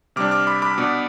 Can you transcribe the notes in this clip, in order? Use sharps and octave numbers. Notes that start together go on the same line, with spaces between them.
C3 G3 D4 D6 F6
D6 F6
B5 D6
B5 D6
B2 B3 D4